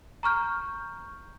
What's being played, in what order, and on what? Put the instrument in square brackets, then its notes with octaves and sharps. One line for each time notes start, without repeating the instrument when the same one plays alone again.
[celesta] A#5 C#6 F6 G6